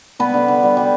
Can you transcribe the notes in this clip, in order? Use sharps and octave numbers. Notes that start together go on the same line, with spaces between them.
G3 B3 B4
D3
D3
G3
G3